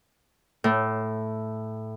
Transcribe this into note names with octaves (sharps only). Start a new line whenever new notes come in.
A2